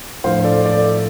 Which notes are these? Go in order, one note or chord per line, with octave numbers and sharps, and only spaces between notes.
A2 F3 D4 C5 F5
A4 D5
A4 D5